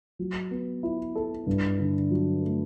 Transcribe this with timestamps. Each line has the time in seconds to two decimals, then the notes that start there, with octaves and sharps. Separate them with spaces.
0.19 F#3
0.51 B3
0.83 E4
1.15 A4
1.47 G2
1.79 D3
2.11 F#3
2.42 A3